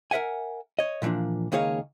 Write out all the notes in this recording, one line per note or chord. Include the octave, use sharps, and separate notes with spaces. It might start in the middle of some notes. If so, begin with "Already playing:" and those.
A#4 B4 E5 F#5 G#5
C#5 D#5
A#2 E3 F3 A#3 D4
C#2 D#3 A#3 G#4 C#5 F5